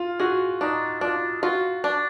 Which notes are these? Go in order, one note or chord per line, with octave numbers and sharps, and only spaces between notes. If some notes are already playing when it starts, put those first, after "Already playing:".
Already playing: F4
F#4 G#4
D4 D#4
D4 F4
F4 F#4
D4